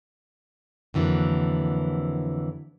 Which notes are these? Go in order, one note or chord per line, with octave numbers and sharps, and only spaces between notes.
F2 D3 E3 F#3 A#3